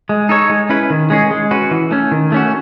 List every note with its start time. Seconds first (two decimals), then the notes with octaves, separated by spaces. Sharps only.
0.09 G#3
0.29 D#4 A4 C#5
0.50 G#3
0.69 C#4 E4 B4
0.90 D#3
1.10 G#3 C#4 G#4
1.31 G#3
1.51 C#4 F#4 B4
1.71 E3
1.91 A3 C#4
2.11 D#3
2.32 A3 C#4 F#4